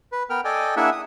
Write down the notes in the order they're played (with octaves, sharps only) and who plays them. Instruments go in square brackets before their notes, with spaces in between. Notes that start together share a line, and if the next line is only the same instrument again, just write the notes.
[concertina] B4
B3 A#4 G5 F6
A4 D5 D#5 G5 G#5
A#3 D4 E4 G#4 E5 F#5
D#6